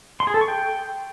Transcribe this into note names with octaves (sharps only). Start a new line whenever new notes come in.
C6
G#4
A4
C#6
G5